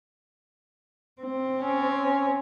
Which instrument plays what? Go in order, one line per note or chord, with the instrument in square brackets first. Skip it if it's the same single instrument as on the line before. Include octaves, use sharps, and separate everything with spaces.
[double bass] C4
[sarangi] C#4